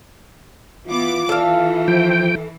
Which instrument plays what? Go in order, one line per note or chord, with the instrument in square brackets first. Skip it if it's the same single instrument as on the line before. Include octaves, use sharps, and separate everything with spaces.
[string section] E3 B3 D6 [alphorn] F4
[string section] E3 [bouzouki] A4 F5
[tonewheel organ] F3 G5